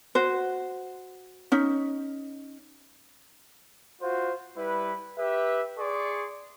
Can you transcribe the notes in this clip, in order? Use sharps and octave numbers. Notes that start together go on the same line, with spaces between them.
F#4 C5
C#4 D#4
F4 F#4 C5
G3 E4 B4
G4 B4 E5
G#4 D5 C6 C#6